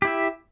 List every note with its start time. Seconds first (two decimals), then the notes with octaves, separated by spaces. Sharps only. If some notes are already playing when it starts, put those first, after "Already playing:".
0.02 G4
0.05 E4
0.07 E5